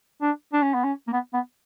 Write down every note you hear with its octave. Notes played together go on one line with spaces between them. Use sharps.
D4
D4
C#4
B3
C#4
A#3
B3
B3